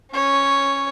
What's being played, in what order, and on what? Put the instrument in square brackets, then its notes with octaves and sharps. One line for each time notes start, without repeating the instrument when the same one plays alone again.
[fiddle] C#4 C#5